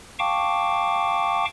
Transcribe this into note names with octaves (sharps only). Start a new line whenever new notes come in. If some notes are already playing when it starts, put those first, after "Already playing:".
F5 G5 A5 C#6 D6